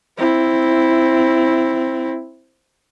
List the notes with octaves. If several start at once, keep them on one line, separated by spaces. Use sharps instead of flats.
C4 E4